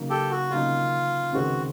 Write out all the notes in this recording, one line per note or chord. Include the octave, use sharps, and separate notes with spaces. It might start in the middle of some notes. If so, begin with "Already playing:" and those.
Already playing: C#3 F#3 A#3 D#4
G4 A4
F#4
C#3 F#3 A#3 D#4 F4
C#2 C3 D#3 G#3 C4 F#4